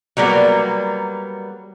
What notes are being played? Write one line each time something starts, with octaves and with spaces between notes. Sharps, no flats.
F#3 G3 A#3 B3